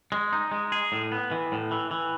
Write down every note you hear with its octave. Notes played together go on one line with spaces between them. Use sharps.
G#3
D#4
G#3
G#4
A2
B3
E3
A2
E3
E3